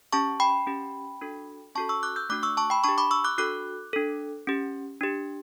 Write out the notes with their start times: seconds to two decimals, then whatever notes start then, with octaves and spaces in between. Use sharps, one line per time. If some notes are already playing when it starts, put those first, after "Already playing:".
0.12 C#4 G4 A5 C#6
0.40 G5 B5
0.67 C#4 G4
1.21 D4 F#4 A4
1.75 C#4 F#4 A4 A5 C#6
1.89 C#6 E6
2.03 D6 F#6
2.16 E6 G6
2.29 A3 D4 F#4 D6 F#6
2.43 C#6 E6
2.57 A5 C#6
2.70 G5 B5
2.84 D4 G4 A5 C#6
2.98 B5 D6
3.11 C#6 E6
3.24 D6 F#6
3.38 D4 F#4 A4 D6 F#6
3.93 D4 A4
4.47 C#4 G4
5.01 D4 G4